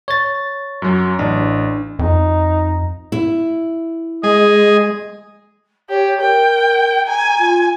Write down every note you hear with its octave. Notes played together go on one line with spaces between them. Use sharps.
C#5 A6
F#2 F#3
A1 D4
F2 D#4
E4
G#3 G#4 D#5
G4 C#5
A#4 G5
G#5 A#5
F4